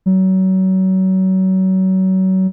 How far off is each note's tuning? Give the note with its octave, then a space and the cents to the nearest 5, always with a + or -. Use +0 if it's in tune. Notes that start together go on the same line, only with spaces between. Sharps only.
F#3 +30